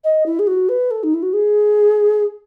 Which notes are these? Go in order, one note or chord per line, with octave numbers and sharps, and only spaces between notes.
D#5
E4
G#4
F#4
B4
A4
D#4
E4
F#4
G#4